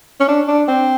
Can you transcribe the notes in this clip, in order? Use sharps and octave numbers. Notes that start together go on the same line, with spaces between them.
C#4
D4
D4
C4